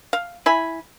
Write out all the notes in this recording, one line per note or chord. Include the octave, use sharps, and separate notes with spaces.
F5
E4 G#5 B5